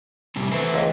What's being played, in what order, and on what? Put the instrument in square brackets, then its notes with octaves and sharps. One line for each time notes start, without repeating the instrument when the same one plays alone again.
[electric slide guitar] A2 C3 G3
[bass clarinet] E3 [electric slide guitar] A3 C4
[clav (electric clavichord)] C#2